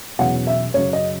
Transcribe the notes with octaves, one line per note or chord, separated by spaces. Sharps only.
E1 E2 B2 F#3 C#4 F#5
E5
F#2 C#3 F#3 C#5
D#5